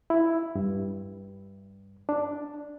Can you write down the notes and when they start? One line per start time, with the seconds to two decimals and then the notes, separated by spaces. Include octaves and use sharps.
0.10 E4
0.55 G2
2.09 D4